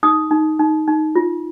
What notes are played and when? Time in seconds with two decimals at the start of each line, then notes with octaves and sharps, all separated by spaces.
0.03 D#4 D#6
0.31 D#4
0.59 D#4
0.88 D#4
1.16 F4